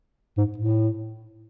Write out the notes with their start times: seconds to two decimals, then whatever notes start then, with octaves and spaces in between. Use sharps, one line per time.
0.38 G#2
0.58 A2